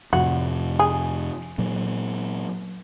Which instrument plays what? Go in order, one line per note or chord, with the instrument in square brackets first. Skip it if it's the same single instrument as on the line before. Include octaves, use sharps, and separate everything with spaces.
[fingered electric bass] F2 A2 C3 [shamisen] F#4
[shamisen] G#4
[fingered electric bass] A#2 F#3